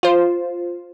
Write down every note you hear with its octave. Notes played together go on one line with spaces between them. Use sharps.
F4 C5